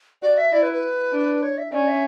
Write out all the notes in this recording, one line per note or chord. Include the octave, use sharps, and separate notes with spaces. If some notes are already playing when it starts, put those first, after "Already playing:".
F#4 D5
E5
E4 D5
B4
B4
D4
C#5
E5
C#4 D5
E5